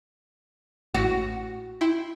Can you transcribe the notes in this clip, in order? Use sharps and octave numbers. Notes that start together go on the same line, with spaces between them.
A1 A2 F#4 A6
E4 G5 C6